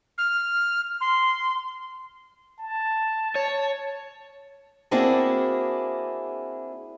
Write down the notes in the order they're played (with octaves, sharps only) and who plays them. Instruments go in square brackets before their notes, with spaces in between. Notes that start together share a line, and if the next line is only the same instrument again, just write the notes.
[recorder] F6
C6
[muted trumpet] A5
[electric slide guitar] C#5
[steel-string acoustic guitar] A#3 C4 D4 E4 F#4 G#4